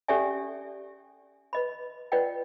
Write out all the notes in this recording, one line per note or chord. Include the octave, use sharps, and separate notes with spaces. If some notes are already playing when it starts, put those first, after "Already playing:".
C#4 G4 A4 D5 E5 G#5
B4 D#5 B5
F4 B4 D5 D#5 F#5 G5